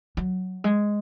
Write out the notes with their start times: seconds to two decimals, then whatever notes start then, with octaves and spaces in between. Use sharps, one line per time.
0.17 F#3
0.64 G#3